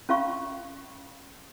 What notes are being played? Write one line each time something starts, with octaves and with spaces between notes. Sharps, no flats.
C#4 F4 F5 C#6